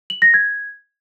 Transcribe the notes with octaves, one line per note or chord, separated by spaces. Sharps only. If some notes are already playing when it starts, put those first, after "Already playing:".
F#7
A#6
G#6